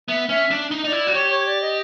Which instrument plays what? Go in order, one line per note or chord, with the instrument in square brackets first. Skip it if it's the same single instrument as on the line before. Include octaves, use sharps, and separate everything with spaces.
[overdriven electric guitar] B3 [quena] E5
[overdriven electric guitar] C#4 [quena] E5
[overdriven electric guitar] D4
D#4
[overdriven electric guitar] D#4 [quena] D5 D#5
[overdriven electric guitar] E4
F#4
[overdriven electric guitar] G4 [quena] C#5
[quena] C#5
D5
D#5